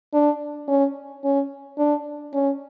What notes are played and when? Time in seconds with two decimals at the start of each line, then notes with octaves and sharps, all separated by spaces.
0.13 D4
0.68 C#4
1.24 C#4
1.78 D4
2.33 C#4